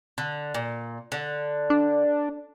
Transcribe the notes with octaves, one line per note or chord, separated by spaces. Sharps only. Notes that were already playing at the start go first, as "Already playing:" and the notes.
D3
A#2
D3
D4